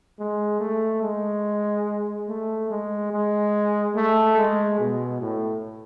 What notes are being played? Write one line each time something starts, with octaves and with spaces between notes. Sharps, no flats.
G#3
A3
G#3
A3
G#3
G#3
A3
G#3
B2
A2